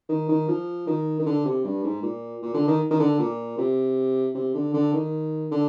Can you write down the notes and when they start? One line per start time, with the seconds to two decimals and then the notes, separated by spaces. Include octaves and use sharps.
0.09 D#3
0.29 D#3
0.48 F3
0.87 D#3
1.19 D#3
1.26 D3
1.45 C3
1.64 G2
1.84 G#2
2.02 A#2
2.42 A#2
2.54 D3
2.67 D#3
2.91 D#3
2.99 D3
3.19 A#2
3.58 C3
4.35 C3
4.55 D3
4.74 D3
4.94 D#3
5.51 D3